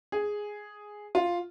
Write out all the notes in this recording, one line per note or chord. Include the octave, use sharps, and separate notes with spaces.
G#4
F4